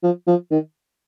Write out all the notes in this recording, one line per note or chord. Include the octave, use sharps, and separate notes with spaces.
F3
F3
D#3